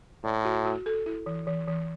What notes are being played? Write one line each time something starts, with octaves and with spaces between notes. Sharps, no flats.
A2 D5
F#4
F#4
A4
E4
E3
E3
E3